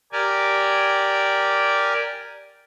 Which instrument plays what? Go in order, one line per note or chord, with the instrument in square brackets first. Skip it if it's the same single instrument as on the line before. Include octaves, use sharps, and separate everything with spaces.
[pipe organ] G4 A#4 D5 G#5